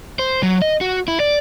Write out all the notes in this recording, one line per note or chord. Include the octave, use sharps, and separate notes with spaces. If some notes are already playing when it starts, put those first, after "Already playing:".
C5
F#3
D#5
F#4
E4
D5